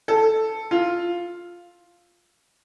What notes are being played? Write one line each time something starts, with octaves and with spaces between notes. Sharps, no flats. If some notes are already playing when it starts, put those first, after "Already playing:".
A4
F4